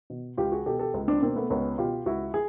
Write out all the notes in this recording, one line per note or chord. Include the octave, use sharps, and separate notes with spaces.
B2
C#2 F4 G4
F#4 G#4
B2 G4 A4
G4 A4
C#2
C4 D4
B2 A#3 C4
A3 B3
C#2 B3 C#4
B2 F4 G4
C#2 E4 F#4
G#4